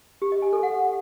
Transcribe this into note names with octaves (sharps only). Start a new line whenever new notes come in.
G4
D#5
G#5
A4
F#5